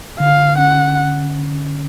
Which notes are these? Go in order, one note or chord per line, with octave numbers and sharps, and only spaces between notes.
D3 F5
C#4 F#5